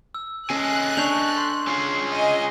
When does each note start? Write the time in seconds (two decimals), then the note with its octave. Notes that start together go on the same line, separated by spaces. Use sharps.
0.15 E6
0.50 C#4 A4 D#5 G#5 F#6
0.97 D4 C#6 G6 F7
1.37 C6
1.67 C#4 F4 G#4
2.15 D#5 G#5